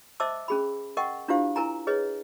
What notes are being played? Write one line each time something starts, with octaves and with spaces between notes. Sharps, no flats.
C5 D#5 E5 A5 D6 E6
C#4 G#4 B5
A#4 D#5 F#5 G5 C#6
D4 E4 F4 G4 C5 F5
E4 A#4 G#5 A#5
G#4 B4 C#5 D#5